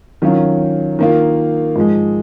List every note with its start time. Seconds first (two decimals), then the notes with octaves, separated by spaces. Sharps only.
0.22 D#3 F#3 C#4 F4
0.99 D#3 A#3 F4
1.76 G#2 F3 G#3